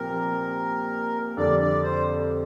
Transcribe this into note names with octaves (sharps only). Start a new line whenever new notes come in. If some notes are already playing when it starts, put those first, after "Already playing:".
Already playing: A#2 F3 C4 G4 A#4
F2 D3 G3 D4 D5
D5
C5